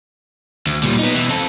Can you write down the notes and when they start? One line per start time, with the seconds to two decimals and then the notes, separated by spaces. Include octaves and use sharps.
0.67 D2
0.83 A#2 G3
0.99 B3 D#4
1.14 B2 E3
1.29 C4 A4